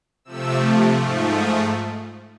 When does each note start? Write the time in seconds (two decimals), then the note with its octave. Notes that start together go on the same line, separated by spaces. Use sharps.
0.24 C3 F3 A3 E6
0.93 G#2 F3 A3
1.26 D#6